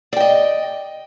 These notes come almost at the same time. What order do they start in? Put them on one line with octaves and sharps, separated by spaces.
D5 G5 D#5